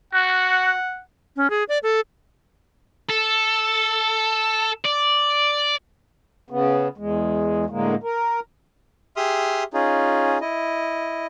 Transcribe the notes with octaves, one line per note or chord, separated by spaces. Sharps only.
F#4 F#5
C#4
G#4
D5
A4
A4
D5
C#3 B3
E2 G#3
A2 D3 G#3 A#3
A#4
G4 G#4 E5 C6 D#6 F6
C#4 D#4 F4 G#4
E4 D#5